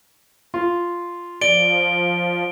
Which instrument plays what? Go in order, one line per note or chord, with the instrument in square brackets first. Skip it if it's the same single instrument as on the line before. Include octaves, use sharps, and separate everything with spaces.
[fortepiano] F4
[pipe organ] F3 [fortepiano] D5 [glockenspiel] D7 G7